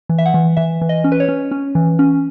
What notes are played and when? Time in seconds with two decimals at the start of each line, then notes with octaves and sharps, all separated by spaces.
0.09 E3
0.18 E5
0.26 F#5
0.34 E3
0.57 E3 E5
0.81 E3
0.89 D#5
1.04 C#4
1.12 B4
1.20 C#5
1.29 C#4
1.51 C#4
1.75 E3
1.99 C#4